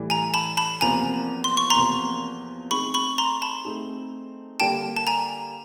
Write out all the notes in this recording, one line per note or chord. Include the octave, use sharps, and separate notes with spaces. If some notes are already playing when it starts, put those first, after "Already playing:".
Already playing: A2 E3 G3
G#5 A#5
A5 B5
A5 B5
E2 C3 F3 A#3 G#5 A#5
C6
C#6
A#5 C6
E2 C3 F3 A#3
A3 C4 D#4 G#4 B5 C#6
B5 C#6
A#5 C6
A5 B5
A3 C4 D#4 G#4
D3 G3 A#3 G5 A5
A5
G#5 A#5